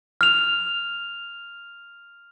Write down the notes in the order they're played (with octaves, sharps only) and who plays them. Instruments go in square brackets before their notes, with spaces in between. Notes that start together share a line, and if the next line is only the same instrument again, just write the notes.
[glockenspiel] F6 F7